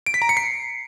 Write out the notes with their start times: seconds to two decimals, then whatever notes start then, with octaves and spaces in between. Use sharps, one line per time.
0.06 D7
0.14 B6
0.22 A#5
0.29 C#7
0.37 C7